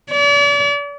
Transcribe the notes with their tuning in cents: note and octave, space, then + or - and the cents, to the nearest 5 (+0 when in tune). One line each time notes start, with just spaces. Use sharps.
D5 -40